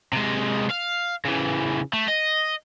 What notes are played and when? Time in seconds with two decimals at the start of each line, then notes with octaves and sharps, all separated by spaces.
0.13 C3 G#3
0.70 F5
1.25 C#3 E3
1.93 A3
2.08 D#5